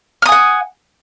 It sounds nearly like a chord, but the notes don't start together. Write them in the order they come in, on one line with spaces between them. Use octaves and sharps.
F6 D#6 G#5 F#5